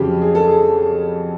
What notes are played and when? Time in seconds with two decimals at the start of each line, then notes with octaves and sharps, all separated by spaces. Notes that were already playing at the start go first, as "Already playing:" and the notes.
Already playing: F2 C#3 F#3 G4
0.22 G#4
0.35 A4
0.48 G#4